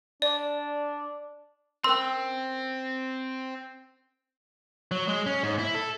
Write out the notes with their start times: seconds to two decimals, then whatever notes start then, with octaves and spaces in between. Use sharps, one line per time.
0.22 D4 D5
1.84 C4 C#4 A#4 C6 E6
4.91 F#3
5.08 G#3
5.27 C#4
5.43 G#2
5.59 E4
5.75 A4